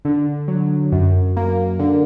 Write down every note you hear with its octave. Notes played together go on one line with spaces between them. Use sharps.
D3
F#3
F#2
A#3
D3